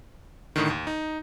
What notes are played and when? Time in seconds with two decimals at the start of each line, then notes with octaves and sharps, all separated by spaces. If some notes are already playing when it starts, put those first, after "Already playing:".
0.56 A2 D3 D#3
0.70 D#2
0.87 D#4